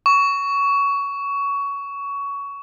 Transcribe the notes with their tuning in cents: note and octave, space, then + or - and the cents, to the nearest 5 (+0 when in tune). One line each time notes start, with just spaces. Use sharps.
C#6 +20